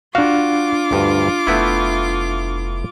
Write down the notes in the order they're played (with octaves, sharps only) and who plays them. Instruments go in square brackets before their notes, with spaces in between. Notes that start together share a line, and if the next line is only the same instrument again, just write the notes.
[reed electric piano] D4 F5 [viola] F4 D6 [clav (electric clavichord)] F#4
[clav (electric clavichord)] D2 G2
[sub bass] F1 [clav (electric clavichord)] A3 B3 E4